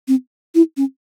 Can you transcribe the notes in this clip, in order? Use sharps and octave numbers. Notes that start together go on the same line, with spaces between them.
C4
E4
C#4